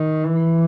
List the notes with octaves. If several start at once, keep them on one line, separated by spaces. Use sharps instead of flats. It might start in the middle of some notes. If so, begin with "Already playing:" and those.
Already playing: D#3
E3